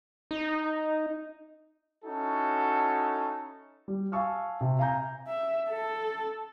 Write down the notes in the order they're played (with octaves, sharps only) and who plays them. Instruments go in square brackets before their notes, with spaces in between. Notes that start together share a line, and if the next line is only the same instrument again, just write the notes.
[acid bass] D#4
[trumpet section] C#4 D#4 E4 F#4 A4
[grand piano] G3
F5 G#5 A5 C#6 E6 F6
C3
F5 G#5 A#5 G6
[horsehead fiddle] E5
A4